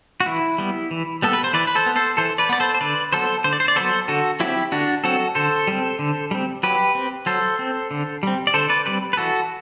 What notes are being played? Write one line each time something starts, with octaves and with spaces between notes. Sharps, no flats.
F#4
E3 E4
G3 B3
E3
G3 B3 A4
B4
C5
E3 B4 D5
B4
A4 C5
B3
A4 C5
E3 A4 C5
B4 D5
B3 D5
A4 C5
C5
D3 B4 D5
F#3 B3 A4 C5
D3 C5
D5
C5
D5
F#3 B3 A4 C5
D3 F#4 A4
F#3 C4 E4 G4
D3 D4 F#4
F#3 C4 F#4 A4
D3 A4 C5
G3 C4
D3
G3 C4
F#3 G4 B4
C4
F#3 A4 C5
C4
D3
G3 C4
D5
D3 A4 C5
B4 D5
G3 C4 B4 D5
B4
E3 F#4 A4